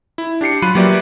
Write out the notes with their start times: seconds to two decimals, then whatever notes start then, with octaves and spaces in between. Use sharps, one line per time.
0.18 E4
0.41 D4 G4 C7 C#7
0.62 F#3 F4 B5 F#6 D#7
0.75 F#3 A#3 G4 B4 D5 E5